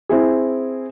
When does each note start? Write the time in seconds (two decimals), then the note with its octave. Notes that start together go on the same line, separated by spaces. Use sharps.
0.09 C4 E4 G#4